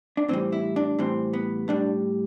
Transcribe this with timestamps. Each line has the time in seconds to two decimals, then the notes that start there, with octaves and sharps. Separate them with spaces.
0.17 D4
0.28 A2 E3 G3 C4
0.52 E4
0.76 D4
0.98 A2 E3 G3 C4
1.33 B3
1.68 A2 G3 D4